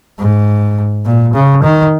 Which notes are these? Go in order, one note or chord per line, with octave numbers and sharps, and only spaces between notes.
G#2
A#2
C#3
D#3